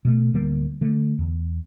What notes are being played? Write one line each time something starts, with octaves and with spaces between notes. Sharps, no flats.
B2 A3
D1 D3 G3 A#3
D3 A3
E2